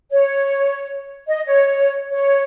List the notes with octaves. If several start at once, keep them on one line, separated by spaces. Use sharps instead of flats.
C#5
D#5
C#5
C#5